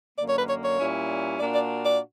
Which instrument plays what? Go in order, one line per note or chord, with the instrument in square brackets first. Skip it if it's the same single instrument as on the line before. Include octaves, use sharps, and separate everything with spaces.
[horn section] F#2 D3 A#3 [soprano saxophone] D5
[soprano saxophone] C#5
B4
C#5
C#5
[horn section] A#2 G3 C#4 E4
[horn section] A#2 A#3 D4 F#4 [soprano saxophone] D5
[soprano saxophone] D5
D5